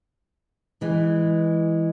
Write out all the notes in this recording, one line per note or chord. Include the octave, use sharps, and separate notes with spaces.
E3 G#3